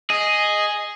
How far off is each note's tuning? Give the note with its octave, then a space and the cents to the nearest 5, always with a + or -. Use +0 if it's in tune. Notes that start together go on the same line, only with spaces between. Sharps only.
G#4 +0 D#5 +0